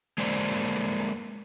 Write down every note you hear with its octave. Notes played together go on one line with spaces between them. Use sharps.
G#3 A#3 C5 D5